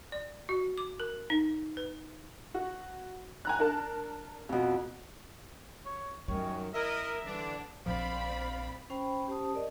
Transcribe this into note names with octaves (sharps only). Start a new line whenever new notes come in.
D5
F#4
D6
A#4
D#4
B4
F#4
G#5 A#5 F#6
D4 A#4 A5
F2 B2
C#5
F#2 D#3 G3 C#5
E4 A#4 D#5 E5
D3 E3 D4
A#1 F3 C4 D5 F5 B5
C#4 C5 G5 B5
C#4 G4 C5 A5 D#6
A#4 D5 D#5